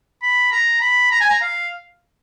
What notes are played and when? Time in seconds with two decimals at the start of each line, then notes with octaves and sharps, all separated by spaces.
0.22 B5
0.52 A#5
0.81 B5
1.11 A#5
1.21 G#5
1.30 A#5
1.42 F5